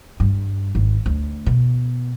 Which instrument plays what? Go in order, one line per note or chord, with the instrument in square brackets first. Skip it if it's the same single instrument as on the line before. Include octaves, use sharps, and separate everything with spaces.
[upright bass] G2
G#1
D2
B2